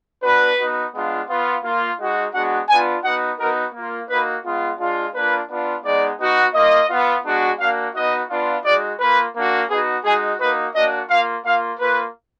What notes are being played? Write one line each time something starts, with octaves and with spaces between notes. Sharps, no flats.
B3 D4 F#4 B4
B3 D#4 F#4
G#3 B3 D4 F4
B3 F4
A#3 F4
G#3 D#4 F#4
G#3 B3 D4 F#4 F#5
B3 D4 F4 G#5
B3 D#4 F#4 F#5
B3 D#4 F#4 A#4
A#3 F4
A#3 D#4 F#4 B4
G#3 B3 F4
G#3 D4 F4
A#3 D4 F4 B4
B3 D4 F4
G#3 B3 D#4 D5
B3 D#4 F#4
A#3 F4 D#5
B3 F4
G#3 B3 D4 F#4
A#3 D4 F#4 F5
B3 D#4 F#4 D#5
B3 D4 F4
G#3 D#4 F#4 D5
A#3 F4 B4
A#3 D4 F#4
B3 D#4 F#4 G#4
G#3 D#4 F#4 G#4
A#3 D#4 F#4 B4
A#3 D4 F#4 D#5
A#3 F4 F5
A#3 F4 F5
A#3 F4 B4